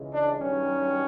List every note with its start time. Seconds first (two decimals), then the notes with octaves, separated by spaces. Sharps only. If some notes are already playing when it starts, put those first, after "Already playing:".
Already playing: C#2 C#3 E3 G#3
0.11 D4
0.40 G2 D#3 F#3 C#4